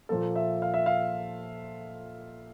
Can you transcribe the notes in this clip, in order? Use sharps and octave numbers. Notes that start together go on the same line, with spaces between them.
A#2 F3 A#3 A4
E5
F5
E5
F5